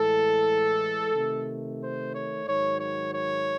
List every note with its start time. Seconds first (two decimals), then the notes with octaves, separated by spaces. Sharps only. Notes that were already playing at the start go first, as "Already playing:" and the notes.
Already playing: A2 E3 G#3 A4
1.14 C3 D#3 A3
1.80 C5
2.13 C#5
2.46 G#2 D#3 F#3 C#5
2.79 C#5
3.13 C#5